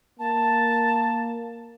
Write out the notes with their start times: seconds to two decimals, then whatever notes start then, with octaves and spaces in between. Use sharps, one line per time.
0.19 A#3 A5